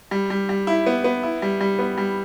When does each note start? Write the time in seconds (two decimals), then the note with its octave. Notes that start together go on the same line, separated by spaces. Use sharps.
0.11 G3
0.30 G3
0.49 G3
0.67 E4
0.86 B3
1.04 B3
1.23 E4
1.42 G3
1.61 G3
1.79 B3
1.98 G3